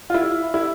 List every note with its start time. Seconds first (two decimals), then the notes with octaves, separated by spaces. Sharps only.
0.10 F4
0.14 E4
0.54 E4